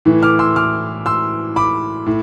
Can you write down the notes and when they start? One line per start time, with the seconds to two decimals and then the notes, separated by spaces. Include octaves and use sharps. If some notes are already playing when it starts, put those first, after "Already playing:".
0.05 A2 E3
0.23 D6 F6
0.39 C6 E6
0.56 D6 F6
1.06 C6 E6
1.56 B5 D6
2.06 A2